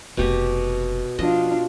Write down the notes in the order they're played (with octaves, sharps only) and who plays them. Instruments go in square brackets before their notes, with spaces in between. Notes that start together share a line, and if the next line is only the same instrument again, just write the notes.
[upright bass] F1 C4 [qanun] B2 G4
[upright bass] F3 [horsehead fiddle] D4 F4 [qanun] D#5